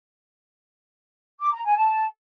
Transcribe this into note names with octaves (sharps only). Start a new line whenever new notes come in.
D6
A#5
G#5
A5